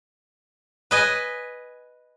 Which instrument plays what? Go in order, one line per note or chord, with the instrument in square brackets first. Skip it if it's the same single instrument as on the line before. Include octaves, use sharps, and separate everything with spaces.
[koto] B4 D#5 G#5